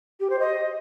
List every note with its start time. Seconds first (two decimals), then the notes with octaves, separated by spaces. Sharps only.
0.20 G4
0.30 C5
0.40 D#5